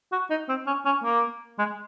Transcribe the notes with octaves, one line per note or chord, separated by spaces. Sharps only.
F#4
D#4
C4
C#4
C#4
A#3
G#3